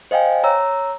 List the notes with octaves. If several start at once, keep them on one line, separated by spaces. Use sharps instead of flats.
C5 D#5 F5 G5 G#5
C#5 A#5 E6